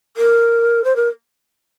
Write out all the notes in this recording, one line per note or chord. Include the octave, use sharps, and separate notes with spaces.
A#4
C5
A#4